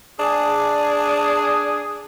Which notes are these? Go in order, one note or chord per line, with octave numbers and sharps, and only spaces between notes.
D4 G#4